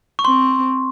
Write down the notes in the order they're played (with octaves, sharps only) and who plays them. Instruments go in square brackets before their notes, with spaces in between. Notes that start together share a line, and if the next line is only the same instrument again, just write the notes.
[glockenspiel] C#6
[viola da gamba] C4 [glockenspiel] C6